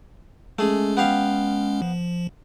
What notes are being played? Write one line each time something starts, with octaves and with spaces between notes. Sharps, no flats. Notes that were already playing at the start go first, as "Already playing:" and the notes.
G#3 A3 C#4 G#4
B3 G4 F5
F3